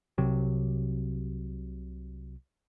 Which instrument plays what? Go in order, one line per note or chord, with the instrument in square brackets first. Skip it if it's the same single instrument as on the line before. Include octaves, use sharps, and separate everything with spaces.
[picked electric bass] C2 C3 F#3